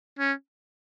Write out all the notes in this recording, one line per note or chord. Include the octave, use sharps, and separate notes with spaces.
C#4